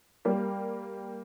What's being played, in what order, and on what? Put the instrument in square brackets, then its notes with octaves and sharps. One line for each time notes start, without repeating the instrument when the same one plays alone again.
[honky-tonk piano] G3 A#3